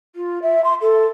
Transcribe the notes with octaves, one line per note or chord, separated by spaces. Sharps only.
F4
E5
C6
A4